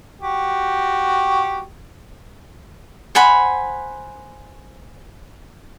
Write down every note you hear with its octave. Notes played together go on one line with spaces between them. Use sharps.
F#4 G4
C5 F#5 G#5 B5